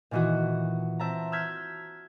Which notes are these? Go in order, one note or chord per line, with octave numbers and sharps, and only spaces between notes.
A#2 D#3 E3 D#4 F#4
C4 E5 A5 A#5
E6 F6 G6 G#6 B6